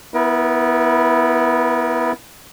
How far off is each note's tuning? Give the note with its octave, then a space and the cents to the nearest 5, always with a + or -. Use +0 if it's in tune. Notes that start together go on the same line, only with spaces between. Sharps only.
B3 +0 E4 +0 A#4 +40